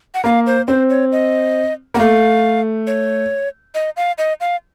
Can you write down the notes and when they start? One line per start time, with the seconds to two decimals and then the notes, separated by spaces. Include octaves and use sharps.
0.14 F#5
0.24 A#3 F5
0.46 C5
0.68 C4 C5
0.90 C#5
1.12 D#5
1.94 A#3 F#5
1.99 A3 F5
2.87 C#5
3.75 D#5
3.97 F5
4.18 D#5
4.41 F5